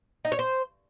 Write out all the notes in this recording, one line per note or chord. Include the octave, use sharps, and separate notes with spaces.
D#4
C#5
C5